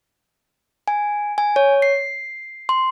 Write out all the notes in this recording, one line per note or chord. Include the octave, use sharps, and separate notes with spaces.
G#5
G#5
C#5
C7
C6